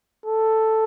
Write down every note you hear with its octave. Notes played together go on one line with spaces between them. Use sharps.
A4